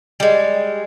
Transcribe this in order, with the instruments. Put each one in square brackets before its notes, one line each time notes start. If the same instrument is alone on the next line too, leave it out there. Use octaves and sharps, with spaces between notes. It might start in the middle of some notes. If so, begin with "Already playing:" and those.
[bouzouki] G3 G#3